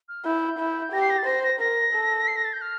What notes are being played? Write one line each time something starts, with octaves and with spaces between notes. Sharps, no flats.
F6
E4 G6
E4
G4 A#6
C7
A#6
A6
C5 A#6
A#6
A#4 A#6
A4
C7
A#6
A6
G6
F6